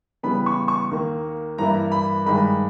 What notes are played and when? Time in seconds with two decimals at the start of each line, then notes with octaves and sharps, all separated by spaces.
0.23 C#3 E3 G3 B3 B5
0.46 C#6
0.68 C#6
0.91 D#2 D#3 A#3
1.58 G2 E3 A#3 E4 A#5
1.92 B5
2.26 G2 D#3 G#3 B5